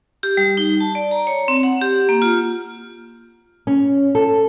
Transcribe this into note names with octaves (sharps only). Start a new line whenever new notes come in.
G4
G3
D#4
A5
D5
A#5
C#5
C4
F#5
G4
A#3
F4
C#4
A4